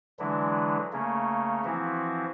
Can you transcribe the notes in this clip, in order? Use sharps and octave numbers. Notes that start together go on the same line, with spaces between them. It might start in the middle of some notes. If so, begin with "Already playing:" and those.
D3 E3 F#3 G#3 D4 E4
C#3 A3 A#3 C#4
E3 F3 C4 E4 F#4